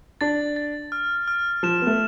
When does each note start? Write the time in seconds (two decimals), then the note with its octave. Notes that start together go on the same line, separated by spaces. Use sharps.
0.21 D4 A6
0.56 A6
0.92 F6
1.28 F6
1.63 F3 E7
1.82 B3
1.87 A3